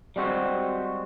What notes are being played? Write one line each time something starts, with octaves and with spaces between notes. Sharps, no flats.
G3 G#3 C4 F#4